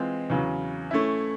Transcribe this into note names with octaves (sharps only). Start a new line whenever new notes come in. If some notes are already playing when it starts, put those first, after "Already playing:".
Already playing: E3 G#3 C4 F4
E2 C#3 F#3
A3 C#4 E4